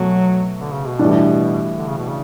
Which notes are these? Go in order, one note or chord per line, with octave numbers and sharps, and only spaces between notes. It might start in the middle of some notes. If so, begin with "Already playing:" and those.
Already playing: B2 F#3 A3
D3
C#3
B2
A2 E3 G3 D4
D3
C#3
B2
C#3